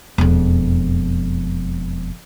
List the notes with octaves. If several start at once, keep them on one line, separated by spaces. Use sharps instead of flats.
E1 F2